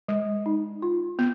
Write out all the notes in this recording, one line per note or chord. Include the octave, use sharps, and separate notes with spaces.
G#3
D#4
F4
B3